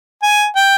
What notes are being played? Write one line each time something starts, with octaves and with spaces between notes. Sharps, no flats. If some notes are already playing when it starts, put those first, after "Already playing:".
G#5
G5